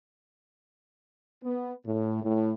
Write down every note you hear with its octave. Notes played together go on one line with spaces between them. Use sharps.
B3
A2
A2